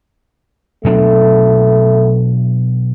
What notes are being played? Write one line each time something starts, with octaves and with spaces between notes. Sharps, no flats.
B2 F#3 A3 D4